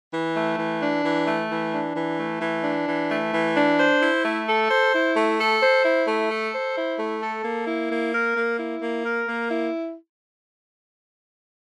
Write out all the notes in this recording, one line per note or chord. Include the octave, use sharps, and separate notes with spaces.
E3
A3
E3
D4
E3
A3
E3
D4
E3
A3
E3
D4
E3
A3
E3
D4
C5
E4
A3
A4
C5
E4
A3
A4
C5
E4
A3
A4
C5
E4
A3
A4
A#3
E4
A#3
A#4
A#3
E4
A#3
A#4
A#3
E4